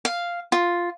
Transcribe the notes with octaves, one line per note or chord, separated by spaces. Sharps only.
F5
F4